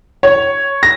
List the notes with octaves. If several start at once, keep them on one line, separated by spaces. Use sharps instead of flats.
C#5
A#6